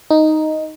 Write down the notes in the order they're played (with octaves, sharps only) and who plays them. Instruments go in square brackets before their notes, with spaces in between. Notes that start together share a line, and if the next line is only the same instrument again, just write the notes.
[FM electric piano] D#4